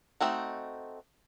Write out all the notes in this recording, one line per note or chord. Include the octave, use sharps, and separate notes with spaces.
A3 C4 D#4 F#4